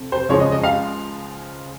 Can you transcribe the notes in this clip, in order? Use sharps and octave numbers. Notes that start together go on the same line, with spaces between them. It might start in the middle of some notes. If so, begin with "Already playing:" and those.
Already playing: F2 C3
C5
C#2 C#3 F3 G#3 C#5
D#5
D#5
F5